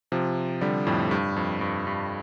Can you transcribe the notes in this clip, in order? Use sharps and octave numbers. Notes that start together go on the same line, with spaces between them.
C3 F3
D3 G3
F2 A2
G2
F2
G2
G2